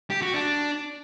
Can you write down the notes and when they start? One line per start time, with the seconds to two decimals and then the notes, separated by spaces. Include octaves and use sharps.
0.10 G4
0.22 F#4
0.34 D4